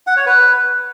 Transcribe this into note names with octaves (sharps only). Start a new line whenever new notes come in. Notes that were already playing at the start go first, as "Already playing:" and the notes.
F#5
C#5
B4